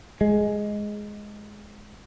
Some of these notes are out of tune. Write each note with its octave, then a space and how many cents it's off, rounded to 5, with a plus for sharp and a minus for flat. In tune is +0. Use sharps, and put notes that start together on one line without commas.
G#3 +5